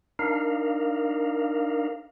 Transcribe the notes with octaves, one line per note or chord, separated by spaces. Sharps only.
D4 D#4 A#4 F5